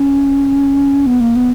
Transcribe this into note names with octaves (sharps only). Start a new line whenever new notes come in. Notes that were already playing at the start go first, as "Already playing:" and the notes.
Already playing: C#4
B3
A#3
B3